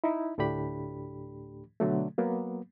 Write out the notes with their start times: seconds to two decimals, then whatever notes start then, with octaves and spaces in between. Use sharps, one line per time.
0.04 D#4 E4
0.38 D2 A2 A3 D4 G4 B5
1.80 B2 D3 F#3 A3
2.18 F#3 A#3 B3